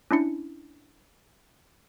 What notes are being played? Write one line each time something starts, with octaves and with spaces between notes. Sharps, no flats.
C#4 D4 E4 C#7